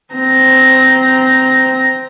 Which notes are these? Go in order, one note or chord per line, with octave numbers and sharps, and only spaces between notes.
C4 A#5